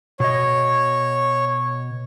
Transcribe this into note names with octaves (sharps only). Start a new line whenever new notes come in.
B2 C#5 D#5